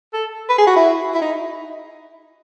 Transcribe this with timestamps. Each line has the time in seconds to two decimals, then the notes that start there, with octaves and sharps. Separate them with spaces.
0.13 A4
0.50 B4
0.58 G#4
0.67 F#4
0.76 E4
1.14 E4
1.22 D#4